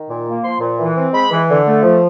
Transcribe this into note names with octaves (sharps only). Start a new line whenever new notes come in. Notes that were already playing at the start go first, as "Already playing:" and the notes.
Already playing: D#3
A#2
A#3
F3 C6
A#2
E3
C4
G#3 B5
E3
D3
A3
F3